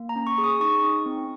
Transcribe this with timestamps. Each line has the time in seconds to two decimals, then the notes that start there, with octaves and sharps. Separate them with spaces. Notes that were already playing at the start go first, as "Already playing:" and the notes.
Already playing: A#3
0.09 A#5
0.16 C#4
0.27 C#6
0.38 G#4
0.44 D#6
0.60 D#4 C#6
0.83 D#4
1.06 C4